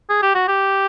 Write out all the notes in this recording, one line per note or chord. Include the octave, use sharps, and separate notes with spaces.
G#4
G4
F#4
G4